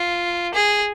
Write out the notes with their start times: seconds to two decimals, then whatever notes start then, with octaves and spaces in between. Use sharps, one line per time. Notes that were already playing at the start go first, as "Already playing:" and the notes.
Already playing: F4
0.54 G#4